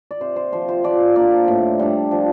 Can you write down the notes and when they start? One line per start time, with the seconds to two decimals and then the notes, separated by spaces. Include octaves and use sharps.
0.11 D5
0.21 C3 C5
0.36 C5
0.52 F3 C4 C5
0.68 C5
0.84 F3 D5
1.16 A#3 D4 D5
1.48 A2
1.79 G3 D4
2.11 F3